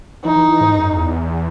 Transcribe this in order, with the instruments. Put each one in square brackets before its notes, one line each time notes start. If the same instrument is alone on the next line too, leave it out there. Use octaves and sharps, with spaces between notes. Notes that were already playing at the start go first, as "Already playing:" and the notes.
[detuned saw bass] E3 [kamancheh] D#4
[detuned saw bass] E3
E3
G#2
F#2
E2